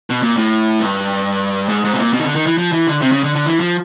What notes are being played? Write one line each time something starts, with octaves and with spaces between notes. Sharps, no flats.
B2
A#2
A2
G2
G#2
G#2
B2
A#2
B2
D#3
D3
D#3
E3
F3
E3
D3
C3
C#3
D3
D3
E3
F3